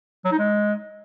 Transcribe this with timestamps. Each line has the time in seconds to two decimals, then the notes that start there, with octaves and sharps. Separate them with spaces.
0.25 F#3
0.32 D#4
0.39 G#3